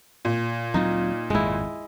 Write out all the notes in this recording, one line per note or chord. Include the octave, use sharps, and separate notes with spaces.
A#2
D2 F#3 C4 D#4 F4
G#1 F2 G#3 E4